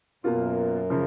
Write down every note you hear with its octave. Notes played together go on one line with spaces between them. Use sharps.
F#2 B2 A#3 F4
C#3 F3